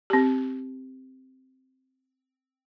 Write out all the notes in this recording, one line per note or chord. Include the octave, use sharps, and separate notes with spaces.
C4 G4